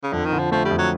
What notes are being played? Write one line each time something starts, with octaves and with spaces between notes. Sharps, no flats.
C#3
F2 D3
D#3
D3
F3
F3 A3
G3
F2
F#3